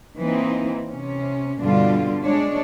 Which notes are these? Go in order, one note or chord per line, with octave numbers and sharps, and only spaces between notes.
E3 A#3 C4 D#4
C3 C#4
G2 B2 D3 G3 D4 F4
G#3 D4 C#5